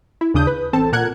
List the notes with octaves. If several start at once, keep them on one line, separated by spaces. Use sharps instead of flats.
E4
D#2 C#3 D4 D#6 G6
B4
A1 C4 A4 A5
A#2 A#4 F#5 F#6 G#6